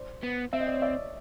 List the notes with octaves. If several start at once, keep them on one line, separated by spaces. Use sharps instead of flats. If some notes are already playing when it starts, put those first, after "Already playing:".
Already playing: C5 D5
B3
C4 E5
D#5
D5
C#5 D#5
D5 E5